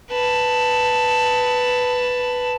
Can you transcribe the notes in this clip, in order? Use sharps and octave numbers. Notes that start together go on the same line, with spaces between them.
B4 A5